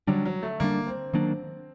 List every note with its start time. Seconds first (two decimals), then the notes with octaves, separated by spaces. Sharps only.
0.07 D3 F#3 G3 D4
0.25 F#3
0.43 A3
0.60 D3 G3 A#3 D4
0.87 C4
1.14 D#3 F#3 A#3 D4